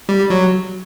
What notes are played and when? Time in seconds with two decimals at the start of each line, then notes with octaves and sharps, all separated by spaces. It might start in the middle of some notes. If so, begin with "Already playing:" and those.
0.09 G3
0.30 F#3